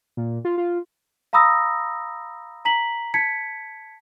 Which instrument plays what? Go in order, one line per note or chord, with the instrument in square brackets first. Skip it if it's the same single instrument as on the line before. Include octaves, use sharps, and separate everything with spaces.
[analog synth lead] A#2
F4
F4
[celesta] F5 A#5 B5 D#6 E6 A#6
A#5 B6 F#7
A5 G#6 B6 C#7